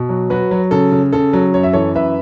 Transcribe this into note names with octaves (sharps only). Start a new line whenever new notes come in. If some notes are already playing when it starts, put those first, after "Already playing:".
Already playing: B2
F#3
F#3 F#4 B4
F#3
C#3 A4
C#3
C#3 A4
F#3
F#2 C#5
E5
E3 A4 C#5
F#2 B4 E5